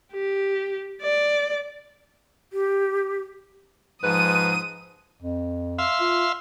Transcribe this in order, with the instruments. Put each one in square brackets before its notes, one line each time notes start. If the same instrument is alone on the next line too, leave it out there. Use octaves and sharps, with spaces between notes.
[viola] G4
D5
[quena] G4
[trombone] G#2 [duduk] F3 [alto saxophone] B4 [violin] D#6 D#7
[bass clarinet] F2
[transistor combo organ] E5 F5 C6
[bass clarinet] F4